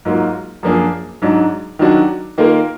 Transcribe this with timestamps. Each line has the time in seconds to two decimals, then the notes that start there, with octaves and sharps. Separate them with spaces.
0.05 G#2 F#3 A#3 F4
0.63 F#2 F3 A#3 D4 G#4
1.22 G#2 F#3 D4
1.79 D#3 F#3 D4 F#4
2.38 D#3 A#3 F4 A#4